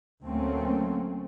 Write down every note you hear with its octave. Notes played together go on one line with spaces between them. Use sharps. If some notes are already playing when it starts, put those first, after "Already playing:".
D2 F#3 A3 A#3 C4 C#4